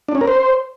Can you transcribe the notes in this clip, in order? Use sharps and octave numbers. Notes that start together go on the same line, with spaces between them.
D4
C#4
A#4
C5